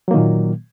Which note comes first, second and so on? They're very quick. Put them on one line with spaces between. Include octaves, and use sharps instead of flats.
F#3 A#3 D#3 A#2